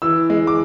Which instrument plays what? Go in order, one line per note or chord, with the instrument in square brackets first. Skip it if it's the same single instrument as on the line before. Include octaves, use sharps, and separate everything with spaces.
[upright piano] E3 E6
G#3
D6